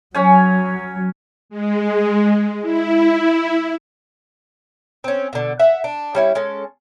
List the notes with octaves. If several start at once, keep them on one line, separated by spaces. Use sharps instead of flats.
F#3 C#4 C#5 G#5
G#3
E4
C4 C#4
B2 D3
E5 F#5
D4
G3 C#4 E4
G#3 C#4 A4